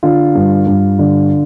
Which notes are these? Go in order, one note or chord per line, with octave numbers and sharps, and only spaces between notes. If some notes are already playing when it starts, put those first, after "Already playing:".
D3 F4
G2
G2
D3